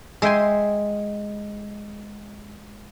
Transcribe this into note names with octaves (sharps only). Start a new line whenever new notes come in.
G#3 E5 G5 G#5 C6